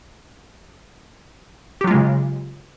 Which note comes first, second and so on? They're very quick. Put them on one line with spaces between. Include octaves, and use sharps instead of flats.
G4 F#3 F4 G#3 C#3